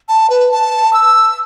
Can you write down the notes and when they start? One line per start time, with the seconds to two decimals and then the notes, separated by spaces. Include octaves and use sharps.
0.09 A5
0.30 B4
0.51 A5
0.93 E6